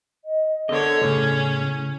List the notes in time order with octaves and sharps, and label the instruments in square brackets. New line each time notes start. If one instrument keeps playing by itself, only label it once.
[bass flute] D#5
[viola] D3 C#5 [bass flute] A4 [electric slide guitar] A#4 D#5
[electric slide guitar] A2 [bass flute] C#3 [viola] C#4